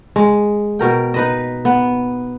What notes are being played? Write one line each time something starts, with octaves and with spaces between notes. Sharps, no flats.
G#3
B2 A#4 G5
D#4 B4 D#5
B3